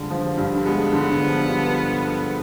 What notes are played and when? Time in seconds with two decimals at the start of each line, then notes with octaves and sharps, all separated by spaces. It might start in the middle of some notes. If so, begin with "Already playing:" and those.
Already playing: G2 D3 F3 G#3
0.10 F3
0.37 G2
0.65 G#3 B3
0.93 D3
1.21 F3
1.48 G2